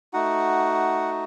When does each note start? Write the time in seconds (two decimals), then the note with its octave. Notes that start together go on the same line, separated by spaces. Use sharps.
0.13 A3 D#4 F#4 F#5